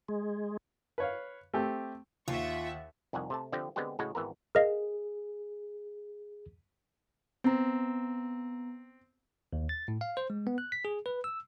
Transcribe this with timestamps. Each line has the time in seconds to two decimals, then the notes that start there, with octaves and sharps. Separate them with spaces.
0.09 G#3
0.98 B4 C#5 F5
1.54 A3 C4 G4
2.28 D#2 F4 E5 F#5 C#6
3.13 C2 F2 D#3 F#5 G#5
3.30 C3 A3 A5
3.52 D3 F3 C4 G4 E5 G5
3.76 D3 G#3 B3 C4 G4
3.99 A2 C#3 G#3 F#4
4.15 G#1 E3 B3 A#4
4.55 G#4 A#4 D#5 F5
7.44 B3 C4 A#5
9.53 D#2
9.69 A6
9.88 A2
10.01 F5
10.17 C5
10.30 G#3
10.47 B3
10.58 F#6
10.72 B6
10.85 G#4
11.06 B4
11.24 E6